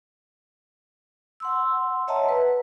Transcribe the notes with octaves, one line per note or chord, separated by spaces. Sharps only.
F#5 C6 E6
C#5 D#5 E5 F#5 A5 A#5
B4